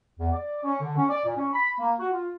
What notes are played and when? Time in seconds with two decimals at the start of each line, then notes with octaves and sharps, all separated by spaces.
0.20 E2
0.32 D5
0.64 C#4
0.81 D3
0.97 C#4
1.10 D5
1.25 A#2
1.37 C#4
1.54 B5
1.79 A#3
1.99 F#4
2.12 F4